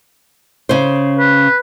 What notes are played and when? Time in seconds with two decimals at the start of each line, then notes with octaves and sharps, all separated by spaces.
0.69 C#3 C5
1.18 B4